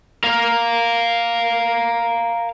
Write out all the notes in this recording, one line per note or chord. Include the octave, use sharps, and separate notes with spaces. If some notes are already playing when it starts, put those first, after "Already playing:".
A#4 F5